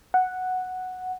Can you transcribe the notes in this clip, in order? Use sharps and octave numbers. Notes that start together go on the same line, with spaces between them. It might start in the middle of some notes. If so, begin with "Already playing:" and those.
F#5